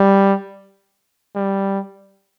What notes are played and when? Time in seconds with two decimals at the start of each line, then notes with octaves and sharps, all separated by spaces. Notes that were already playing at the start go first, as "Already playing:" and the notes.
Already playing: G3
1.36 G3